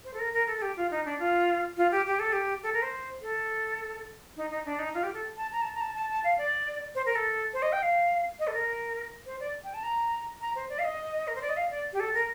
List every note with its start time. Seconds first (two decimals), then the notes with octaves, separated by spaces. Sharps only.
0.04 C5
0.14 A4
0.19 A#4
0.33 A#4
0.47 A4
0.57 A4
0.62 G4
0.77 F4
0.91 D#4
1.05 D4
1.19 F4
1.77 F4
1.91 G4
2.06 G4
2.20 A4
2.33 G4
2.63 A4
2.73 A#4
2.82 C5
3.22 A4
4.37 D#4
4.50 D#4
4.66 D4
4.79 D#4
4.94 F4
5.03 G4
5.14 A4
5.37 A5
5.52 A#5
5.62 A5
5.75 A#5
5.81 A5
5.95 A5
6.10 A5
6.24 F5
6.38 D5
6.95 C5
7.06 A#4
7.15 A4
7.54 C5
7.62 D#5
7.72 G5
7.83 F5
8.39 D#5
8.47 A4
8.54 A#4
9.26 C5
9.40 D5
9.64 G5
9.74 A5
9.83 A#5
10.41 A#5
10.55 C5
10.69 D5
10.79 F5
10.84 D#5
11.27 A#4
11.36 C5
11.42 D5
11.49 D#5
11.57 F5
11.71 D5
11.93 G4
12.00 A4
12.14 A#4